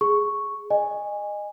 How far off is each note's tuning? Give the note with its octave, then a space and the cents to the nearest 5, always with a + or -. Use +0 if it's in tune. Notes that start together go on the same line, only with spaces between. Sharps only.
G#4 +0 C#6 +0
D#5 -20 G#5 -15